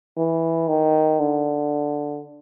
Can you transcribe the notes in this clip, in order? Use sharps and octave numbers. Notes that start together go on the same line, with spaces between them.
E3
D#3
D3